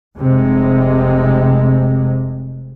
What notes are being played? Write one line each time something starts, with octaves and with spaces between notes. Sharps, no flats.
F1 C3 G#3